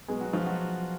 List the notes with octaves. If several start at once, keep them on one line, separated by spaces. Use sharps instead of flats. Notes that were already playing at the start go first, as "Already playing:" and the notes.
B2 F#3 G#3 B3 G#4
F#3 F#4
F3 F4
F#3 F#4